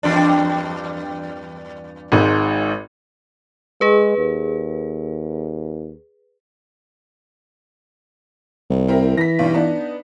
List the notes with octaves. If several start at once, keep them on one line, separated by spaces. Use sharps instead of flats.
E2 G2 D4
G#1 G#2
G#3 G#4 B4
D#2
C2
C4 E4 A#4
E3 A#6 B6
B1 G2
B3 D4 D#4